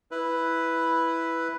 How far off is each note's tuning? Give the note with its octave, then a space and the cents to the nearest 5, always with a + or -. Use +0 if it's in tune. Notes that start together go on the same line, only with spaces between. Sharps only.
E4 +0 B4 +0